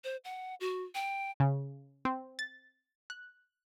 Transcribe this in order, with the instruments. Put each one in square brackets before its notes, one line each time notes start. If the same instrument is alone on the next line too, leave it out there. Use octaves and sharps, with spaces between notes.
[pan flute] C5
F#5
F#4
G5
[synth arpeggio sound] C#3
C4
A6
F#6